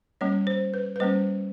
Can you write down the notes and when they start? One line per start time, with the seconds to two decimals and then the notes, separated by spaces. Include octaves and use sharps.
0.21 G3 A#3 C#4 C#5
0.47 C5
0.74 B4
0.96 B4
1.00 G3 A#3 C#4 C5